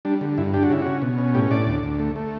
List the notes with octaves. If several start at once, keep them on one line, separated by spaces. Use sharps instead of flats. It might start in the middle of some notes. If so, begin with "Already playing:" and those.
G3 D4
D3
G2 E4
D4 G4
F#4
C#3 E4
C#4 F#4
B2
C#4
A2 G4
A2 D5
D2
D2
A3
A3